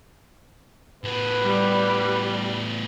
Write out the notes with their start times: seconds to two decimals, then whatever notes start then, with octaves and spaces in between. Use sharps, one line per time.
1.04 A2 B3 B4
1.43 G3